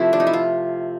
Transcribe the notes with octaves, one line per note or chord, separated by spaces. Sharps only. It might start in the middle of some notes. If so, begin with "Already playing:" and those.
Already playing: C3 F3 A3 E4
D4
D#4
E4
F4